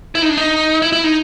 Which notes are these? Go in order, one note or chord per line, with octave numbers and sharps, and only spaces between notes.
E4
D#4
D4
D#4
E4
E4
D#4